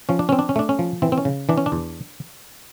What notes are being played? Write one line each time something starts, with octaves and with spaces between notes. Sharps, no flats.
F3 C#4
D4
C4 C#4
D4
C#4
A3 D4
C#4
F3
E3 C4
C4
C#4
C#3
E3 D4
C#4
D4
E2